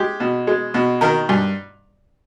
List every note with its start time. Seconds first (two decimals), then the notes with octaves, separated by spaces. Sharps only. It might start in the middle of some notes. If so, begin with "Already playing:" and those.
Already playing: G#3 G4
0.20 B2
0.47 G#3
0.74 B2
1.01 D#3 A#4
1.29 G2